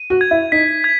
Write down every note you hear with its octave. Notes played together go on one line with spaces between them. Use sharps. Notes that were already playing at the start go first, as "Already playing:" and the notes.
Already playing: D#7
F#4
G#6
E4
D#4 B6
G#6